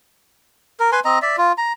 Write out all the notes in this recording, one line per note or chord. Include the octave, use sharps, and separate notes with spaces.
A#4
B4 G#5 C6
C4 D#5 A#5
D5 E5
F4
A#5